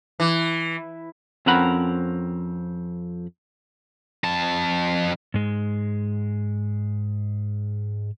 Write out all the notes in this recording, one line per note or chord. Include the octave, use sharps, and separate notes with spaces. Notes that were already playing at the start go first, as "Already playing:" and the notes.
E3
F2 C4 C#4 A#4 F#5 B5
F2 A5
G#2 G#3